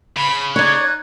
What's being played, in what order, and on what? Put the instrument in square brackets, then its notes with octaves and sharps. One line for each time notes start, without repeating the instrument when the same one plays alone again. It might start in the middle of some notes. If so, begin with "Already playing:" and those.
[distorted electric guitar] C#3 [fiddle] B5
[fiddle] D#4 [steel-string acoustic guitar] C#5 D5 [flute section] F#6 G#6